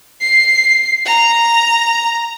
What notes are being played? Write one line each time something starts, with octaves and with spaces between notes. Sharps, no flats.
C7
A#5